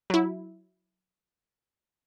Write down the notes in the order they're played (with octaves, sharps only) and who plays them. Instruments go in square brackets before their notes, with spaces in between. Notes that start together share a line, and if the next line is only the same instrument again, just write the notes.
[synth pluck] F#3 E4